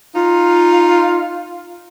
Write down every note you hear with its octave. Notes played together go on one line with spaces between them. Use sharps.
D#4 F4